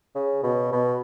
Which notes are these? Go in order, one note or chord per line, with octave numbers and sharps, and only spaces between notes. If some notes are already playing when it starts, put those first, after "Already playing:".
C#3
B2
B2